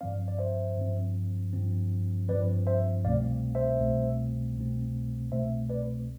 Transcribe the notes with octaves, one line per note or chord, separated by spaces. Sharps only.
G2 F3 C4 D5 F5
D5
C5 E5
G2 F3 C4
G2 F3 C4
G2 F3 C4 B4 D5
C5 E5
C2 B2 A3 C4 D5 F5
C5 E5
C2 B2 A3 C4
C2 B2 A3 C4
C2 B2 A3 C4 C5 E5
B4 D5